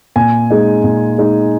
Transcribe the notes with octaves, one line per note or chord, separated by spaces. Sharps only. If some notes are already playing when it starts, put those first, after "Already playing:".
A#2 G#5
G#3 D#4
A#2
G#3 D#4